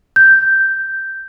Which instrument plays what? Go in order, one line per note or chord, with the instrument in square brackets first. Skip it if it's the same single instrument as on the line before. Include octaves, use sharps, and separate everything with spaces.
[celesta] G6